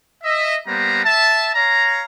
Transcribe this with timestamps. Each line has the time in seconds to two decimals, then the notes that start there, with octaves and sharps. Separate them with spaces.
0.23 D#5 E5
0.67 G3 A#3 B3 C5 A#5
1.04 E5 A5
1.55 C#5 F5 A#5